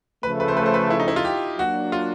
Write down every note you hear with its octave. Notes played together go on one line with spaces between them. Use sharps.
C#3 F3 A3 B4
B4
C5
B4
C5
B4
E4
D#4
E4
F4
G4
F#3 A#3 D4 F#4
F4